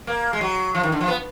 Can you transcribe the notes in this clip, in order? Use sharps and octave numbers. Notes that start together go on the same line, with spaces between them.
A#3
G#3
F#3
F3
D#3
D3
F3
B3